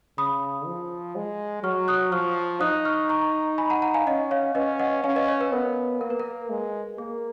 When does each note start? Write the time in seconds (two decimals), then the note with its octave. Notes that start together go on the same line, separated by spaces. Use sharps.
0.18 C#3 B5 D#6
0.66 F3
1.16 G#3
1.63 F#3 C#6 F6
1.88 D#6 F#6
2.12 F3 C#6 F6
2.61 D#4 D#6 F#6
2.85 C#6 F6
3.09 A#5 C#6
3.58 G#5 B5
3.70 F#5 A#5
3.82 F#5 A#5
3.94 F5 G#5
4.07 C#4 D#5 F#5
4.31 C#5 F5
4.55 C#4 B4 D#5
4.79 D#5 F#5
5.04 C#4 F5 G#5
5.16 B4 D#5
5.28 C#5
5.41 B4
5.52 B3 A#4
6.00 A#3 A#4
6.10 B4
6.20 A#4
6.50 G#3
6.98 A#3 G#4